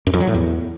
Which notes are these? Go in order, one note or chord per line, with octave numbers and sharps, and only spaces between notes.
F#2
F2
F#3
A2
E2